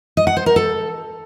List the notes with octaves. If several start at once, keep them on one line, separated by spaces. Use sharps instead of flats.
D#5
F#5
C5
A#4
A4